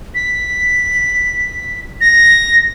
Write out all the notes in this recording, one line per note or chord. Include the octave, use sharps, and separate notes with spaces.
B6
A#6